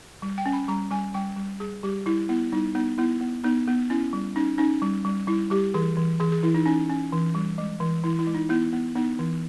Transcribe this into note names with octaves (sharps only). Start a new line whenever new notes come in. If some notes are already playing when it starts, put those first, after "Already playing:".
G3
G5
C#4
B5
G3 A#5
G3 G#5
G3 G5
G3
G3 G#4
G3 G4
G3 E4
B3 E4
G3 D#4
B3 D#4
B3 E4
B3
B3 D#4
B3
C#4 E4
G3
C#4 D#4
C#4 D#4
G3
G3
G3 E4
G3 G4
E3 G#4
E3
E3 G#4
G#4
E3 E4
D#4
C#4 D#4
C#4
E3
G3
G#3
E3
E3 E4
E4
G#3
D#4
B3 E4
B3
B3 D#4
E3